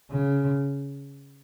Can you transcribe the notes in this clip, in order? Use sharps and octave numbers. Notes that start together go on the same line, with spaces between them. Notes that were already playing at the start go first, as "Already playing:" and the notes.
C#3